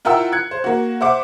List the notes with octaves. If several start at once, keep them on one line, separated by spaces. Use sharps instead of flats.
E4 F4 A#4 F#5 G5 E6
F#6 G#6 C#7
C5
A#3 F#4
C5 E5 F#5 D6